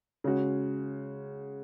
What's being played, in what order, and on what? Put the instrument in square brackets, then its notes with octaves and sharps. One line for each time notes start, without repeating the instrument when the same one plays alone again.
[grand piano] C#3 G#3 F#4